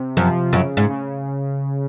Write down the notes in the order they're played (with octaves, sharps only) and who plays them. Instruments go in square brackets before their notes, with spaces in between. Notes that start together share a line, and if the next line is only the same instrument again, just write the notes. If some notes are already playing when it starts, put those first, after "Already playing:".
Already playing: [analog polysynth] C3
[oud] F#2 [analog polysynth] F3
[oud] F#2 [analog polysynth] C#3
[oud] G#2
[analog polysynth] C#3